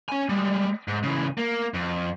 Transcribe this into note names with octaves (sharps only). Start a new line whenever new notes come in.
C#4 G#5
G3 G#3
G#2
C#3 E3
A#3
F2